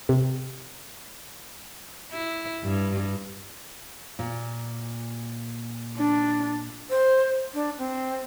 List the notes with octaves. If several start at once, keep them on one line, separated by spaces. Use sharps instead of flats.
C3
E4
G2
A#2
D4
C5
D4
C4